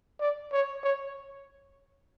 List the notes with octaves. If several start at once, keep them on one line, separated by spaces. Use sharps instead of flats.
D5
C#5
C#5